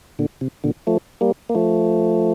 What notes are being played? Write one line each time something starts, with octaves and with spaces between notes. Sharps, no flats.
A#2 D3
C3
A#2 D3
F3 A3
G3 A#3
A#3
F3 A3